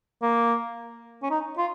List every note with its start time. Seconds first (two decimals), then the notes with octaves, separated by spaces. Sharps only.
0.22 A#3
1.23 C#4
1.31 D#4
1.58 F4